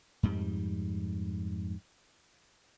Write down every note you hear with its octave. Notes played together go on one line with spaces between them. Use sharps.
F2 G#2 G3